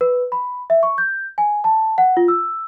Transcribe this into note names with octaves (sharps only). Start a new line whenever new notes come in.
B4
B5
E5
C#6
G6
G#5
A5
F#5
F4
E6